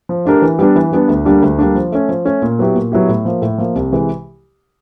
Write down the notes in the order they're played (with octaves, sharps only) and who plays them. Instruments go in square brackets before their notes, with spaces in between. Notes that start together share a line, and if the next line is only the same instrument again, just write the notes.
[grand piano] F3
A3 D4 G4 A#4
E3
G3 B3 D4
E3
G3 B3 D4
D2
D3 G3 A#3 D4
D2
D3 G3 A#3 D4
F3
A3 C#4
F3
A3 C#4
A#2
F#3 B3 E4 G4
A#2
F#3 B3 E4 G4
A2
F3 A#3
A2
F3 A#3
C2
C3 E3 G#3